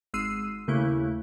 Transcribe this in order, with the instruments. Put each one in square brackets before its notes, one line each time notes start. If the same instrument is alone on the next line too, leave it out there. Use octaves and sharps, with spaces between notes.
[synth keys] G#1 G#3 E6 C7 D#7
D#2 C#3 A3 A#3 E4 F#6